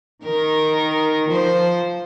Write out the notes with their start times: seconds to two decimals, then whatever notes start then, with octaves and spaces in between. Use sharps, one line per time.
0.24 D#3 A#4
1.30 F3 C5